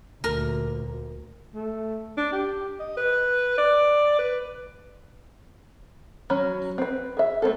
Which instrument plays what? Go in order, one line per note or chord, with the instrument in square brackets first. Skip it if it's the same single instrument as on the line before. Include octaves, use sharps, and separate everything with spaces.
[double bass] D2 A#2 [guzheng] A#4
[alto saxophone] A3
D4
G4
D#5
B4
D5
B4
[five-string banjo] F#3 C#4 F#4 A#5 B5
C4 B4
G#4 E5
A3 A#3 C4 A4